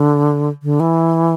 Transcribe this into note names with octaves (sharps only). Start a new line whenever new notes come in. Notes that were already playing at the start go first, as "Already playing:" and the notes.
Already playing: D3
D3
E3